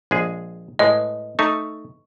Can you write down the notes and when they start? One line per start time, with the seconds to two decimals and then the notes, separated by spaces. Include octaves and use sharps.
0.11 A#1 G#3 G#4
0.79 A2 G#3 B4 D#5
1.39 A3 D#4 A4 C#6